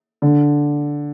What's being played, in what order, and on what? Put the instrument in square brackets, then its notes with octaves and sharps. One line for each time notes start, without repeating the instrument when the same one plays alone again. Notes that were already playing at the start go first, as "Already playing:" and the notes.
[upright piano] D3